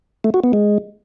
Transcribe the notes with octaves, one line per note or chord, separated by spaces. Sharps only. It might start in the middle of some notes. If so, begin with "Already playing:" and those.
A3
F#4
B3
G#3